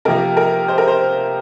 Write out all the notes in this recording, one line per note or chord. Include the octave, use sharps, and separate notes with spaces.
C3 F3 A#3 A#4
A#4
C5
A#4
C5